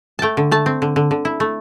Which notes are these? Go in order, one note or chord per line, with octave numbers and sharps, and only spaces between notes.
A3 G5 A5
D3
A3 A5
C4
D3
D3
D3
E4
A3